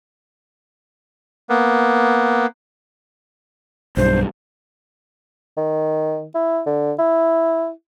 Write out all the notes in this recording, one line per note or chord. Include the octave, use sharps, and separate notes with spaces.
A#3 B3
B1 G2 C5
D#3
E4
D3
E4